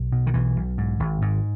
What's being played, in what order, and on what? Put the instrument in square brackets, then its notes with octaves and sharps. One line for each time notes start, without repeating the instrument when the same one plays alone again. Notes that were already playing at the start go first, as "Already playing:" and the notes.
Already playing: [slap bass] B1
B2
D#3
B1 E3
B1
G#2
G#1
G#2